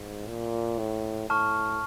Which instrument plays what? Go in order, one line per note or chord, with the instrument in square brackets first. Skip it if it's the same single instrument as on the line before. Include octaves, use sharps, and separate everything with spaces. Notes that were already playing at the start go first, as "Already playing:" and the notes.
Already playing: [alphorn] G#2
A#2
A2
[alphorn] A2 [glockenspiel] A5 C#6 F6